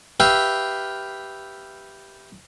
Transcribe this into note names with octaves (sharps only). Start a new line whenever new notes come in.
G4 B4 E5 F5 G5